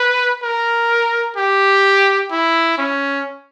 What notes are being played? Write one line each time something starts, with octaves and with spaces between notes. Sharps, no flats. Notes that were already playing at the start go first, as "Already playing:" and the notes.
Already playing: B4
A#4
G4
E4
C#4